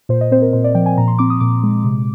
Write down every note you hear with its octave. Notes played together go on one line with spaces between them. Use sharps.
A#2 C5
D#5
C4 C5
A#4
A#2 C5
D5
F3 G5
G#5
A#2 A#5
C6
C4 D6
D#6
A#2 D6
G#3
C3